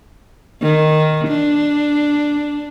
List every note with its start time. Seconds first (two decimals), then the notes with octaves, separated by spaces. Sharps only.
0.61 D#3
1.27 D4